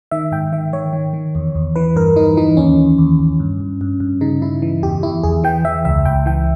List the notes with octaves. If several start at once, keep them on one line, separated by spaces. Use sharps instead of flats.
D#3 E5
G#2 G5
D#3 E5
D#3 C#5
D#3
D#3
E2
E2
E3 B4
G2 A#4
E3 D#4
E3 D#4
D#2 C#4
D#2
D#2
D#2
G2
G2
G2
G2
C#3 D#4
C#3 E4
E3
E2 G4
E2 E4
E2 G#4
E3 G5
E3 E5
C#2 E5
C#2 G5
E3 G5